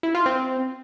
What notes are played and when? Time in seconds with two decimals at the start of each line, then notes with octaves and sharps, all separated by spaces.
0.03 E4
0.15 F4
0.26 C4